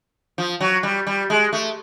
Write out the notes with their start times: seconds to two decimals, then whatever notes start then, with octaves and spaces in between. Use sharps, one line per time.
0.38 F3
0.61 F#3
0.83 G3
1.07 G3
1.30 G#3
1.53 A3